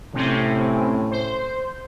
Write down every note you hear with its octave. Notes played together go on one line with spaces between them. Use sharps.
A2 C3 C4 C#4
C5